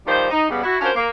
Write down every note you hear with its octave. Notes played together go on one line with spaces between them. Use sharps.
D#3 F3 G3 D#4 C5
D#4
C#3 G3 B3
E4 F#4
C#4 D4 F4 F#4 A#4 C5
A#3